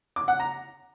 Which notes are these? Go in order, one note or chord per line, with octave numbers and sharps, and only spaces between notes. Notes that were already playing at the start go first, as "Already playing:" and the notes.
D6
F#5
A#5